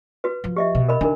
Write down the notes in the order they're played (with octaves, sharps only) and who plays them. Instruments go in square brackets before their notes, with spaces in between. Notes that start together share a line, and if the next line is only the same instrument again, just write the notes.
[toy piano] F#4 B4
[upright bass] F3
[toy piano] G4 D#5 E5
[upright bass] B2
[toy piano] A#4 D#5 B5
[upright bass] D3 [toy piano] D4 D#4 A#4